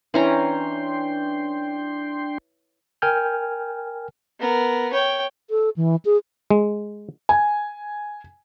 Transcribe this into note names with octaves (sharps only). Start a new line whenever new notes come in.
E3 C#4 D4 G5 A#5 C6
A#4 G5 G#5 F6 G6
B3 A#4
C#5 G5
A4
E3
G#4
G#3
G#5